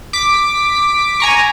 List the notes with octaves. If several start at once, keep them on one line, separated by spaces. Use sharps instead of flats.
D6 B6
G#5 A#5 C#6